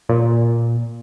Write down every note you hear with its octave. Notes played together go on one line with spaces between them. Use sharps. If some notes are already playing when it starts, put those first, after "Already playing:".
A#2